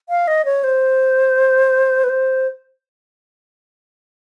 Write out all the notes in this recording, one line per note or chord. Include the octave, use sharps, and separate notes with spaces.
F5
D#5
C#5
C5
B4
C5